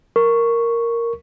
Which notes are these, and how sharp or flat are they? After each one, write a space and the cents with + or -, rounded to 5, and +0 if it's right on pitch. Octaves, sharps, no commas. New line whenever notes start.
A#4 -5 C#6 +0